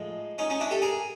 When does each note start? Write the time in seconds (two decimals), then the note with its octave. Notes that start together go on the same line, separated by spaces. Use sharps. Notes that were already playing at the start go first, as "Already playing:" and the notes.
Already playing: A2 F3 G#3 D#4
0.38 C#4 D#4
0.50 C#4 D#4
0.60 D4 E4
0.71 G4 A4
0.82 G#4 A#4